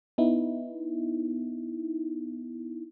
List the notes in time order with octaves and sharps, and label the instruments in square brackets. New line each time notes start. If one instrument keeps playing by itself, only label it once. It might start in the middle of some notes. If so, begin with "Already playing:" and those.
[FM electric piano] B3 D#4 E4